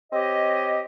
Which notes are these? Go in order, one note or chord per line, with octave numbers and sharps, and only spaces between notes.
C4 G4 C#5 D#5